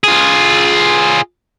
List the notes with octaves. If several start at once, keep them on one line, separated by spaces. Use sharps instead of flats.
F4 G#4